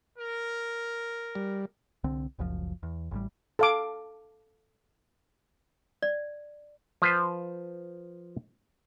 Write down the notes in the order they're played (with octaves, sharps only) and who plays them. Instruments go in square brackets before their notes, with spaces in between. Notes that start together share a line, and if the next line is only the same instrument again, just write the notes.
[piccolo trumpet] A#4
[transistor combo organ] G3
[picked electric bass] C2 D3 C4
F#1 C#2 F#2 F3
E2
A1 A2 G3
[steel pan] A4 F5 D6
[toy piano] D5
[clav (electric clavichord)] F3 B4 C5